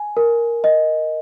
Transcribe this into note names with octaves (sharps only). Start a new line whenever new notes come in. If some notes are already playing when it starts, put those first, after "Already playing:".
Already playing: G#5
A#4
D#5